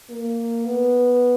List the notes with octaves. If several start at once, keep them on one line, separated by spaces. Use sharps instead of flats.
A#3
B3